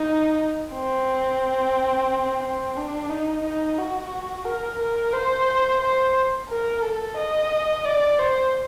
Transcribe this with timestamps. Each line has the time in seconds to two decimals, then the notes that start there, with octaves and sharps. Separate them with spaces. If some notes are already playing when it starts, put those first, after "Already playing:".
Already playing: D#4
0.74 C4
2.43 C4
2.77 D4
3.10 D#4
3.44 D#4
3.78 F#4
4.45 A#4
4.79 A#4
5.13 C5
5.81 C5
6.49 A#4
6.82 A4
7.16 D#5
7.85 D5
8.19 C5